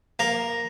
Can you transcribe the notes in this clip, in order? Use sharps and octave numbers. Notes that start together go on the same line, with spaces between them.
A#3